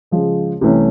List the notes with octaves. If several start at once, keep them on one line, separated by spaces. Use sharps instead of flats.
C#3 F3 G#3
C2 C3 E3 A3 C#4